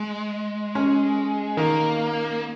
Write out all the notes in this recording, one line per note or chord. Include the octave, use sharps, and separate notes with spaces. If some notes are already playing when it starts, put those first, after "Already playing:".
Already playing: G#3
C#4
D#3 A#3